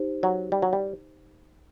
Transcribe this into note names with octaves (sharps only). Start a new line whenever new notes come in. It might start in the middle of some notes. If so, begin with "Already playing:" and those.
Already playing: D#4 G4 C5
F#3
G3
F#3
G3